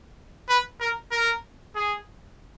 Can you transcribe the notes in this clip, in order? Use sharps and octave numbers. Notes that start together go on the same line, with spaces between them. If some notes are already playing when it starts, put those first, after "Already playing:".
B4
A#4
A#4
G#4